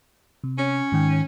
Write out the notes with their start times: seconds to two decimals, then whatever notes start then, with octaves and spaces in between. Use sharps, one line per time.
0.44 C3
0.58 C#4
0.92 G#2 D#3 G5